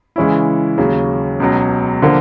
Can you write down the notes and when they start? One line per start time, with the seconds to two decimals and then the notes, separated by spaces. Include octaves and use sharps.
0.16 C#3 E3 G#3 C#4 E4
0.78 D#2 C#3 F#3
1.40 C#2 B2 F#3
2.02 D3 F3 A#3